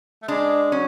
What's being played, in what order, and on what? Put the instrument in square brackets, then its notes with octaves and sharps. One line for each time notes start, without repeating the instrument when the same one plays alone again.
[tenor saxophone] A3
[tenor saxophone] G#3 [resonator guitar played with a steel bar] D4
[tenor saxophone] F#3 [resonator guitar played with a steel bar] C#4